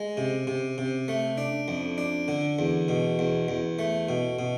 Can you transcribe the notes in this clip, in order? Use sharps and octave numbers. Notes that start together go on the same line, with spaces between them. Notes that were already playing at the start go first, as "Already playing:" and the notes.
Already playing: G#3
C3
C3
C3
A3
D4
F2
D4
D3
E2
B2
E2
E2
A3
B2
B2